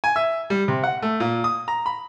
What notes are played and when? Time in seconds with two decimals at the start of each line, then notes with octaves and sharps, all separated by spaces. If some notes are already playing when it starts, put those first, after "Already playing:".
0.04 G#5
0.16 E5
0.50 G3
0.68 C3
0.84 F#5
1.02 A3
1.20 A#2
1.44 D#6
1.68 A#5
1.86 B5